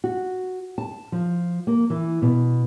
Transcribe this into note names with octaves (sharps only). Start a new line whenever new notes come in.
F#4
A5
F3
A#3
E3
B2